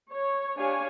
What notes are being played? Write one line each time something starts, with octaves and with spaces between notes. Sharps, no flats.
C#5
D4 G4 C#5 F5 G#5